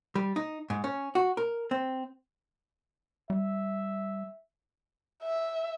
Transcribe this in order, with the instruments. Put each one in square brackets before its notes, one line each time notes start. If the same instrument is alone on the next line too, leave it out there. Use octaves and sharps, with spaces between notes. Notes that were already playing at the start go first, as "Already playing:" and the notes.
[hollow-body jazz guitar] G3
D#4
G#2
C#4
F#4
A#4
C4
[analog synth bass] G3 [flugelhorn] E5
[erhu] E5